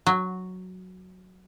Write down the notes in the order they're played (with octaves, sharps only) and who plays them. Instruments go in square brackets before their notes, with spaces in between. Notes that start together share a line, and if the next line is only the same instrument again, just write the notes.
[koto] F#3